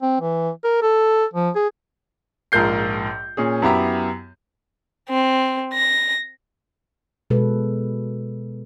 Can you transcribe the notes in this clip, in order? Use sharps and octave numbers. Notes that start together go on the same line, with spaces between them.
C4
E3
A#4
A4
F3
G#4
A#1 G#2 F4 A#4 G6 C7
A#2 C#4 G#4
F#2 B3 E4 G4 A#5
C4
A#6
B2 G#3 A4 B4